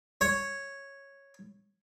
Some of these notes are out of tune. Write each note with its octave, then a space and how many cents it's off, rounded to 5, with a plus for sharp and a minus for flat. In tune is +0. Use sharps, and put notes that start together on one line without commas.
C#5 -5